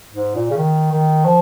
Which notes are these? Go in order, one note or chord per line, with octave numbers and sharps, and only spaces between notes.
G#2
A#2
C#3
D#3
D#3
F3